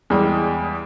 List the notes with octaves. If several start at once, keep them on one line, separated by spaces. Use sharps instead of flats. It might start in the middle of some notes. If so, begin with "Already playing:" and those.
E2 G3 G#3